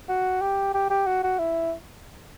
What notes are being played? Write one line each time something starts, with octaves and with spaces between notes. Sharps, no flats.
F#4
G4
G4
G4
F#4
F#4
E4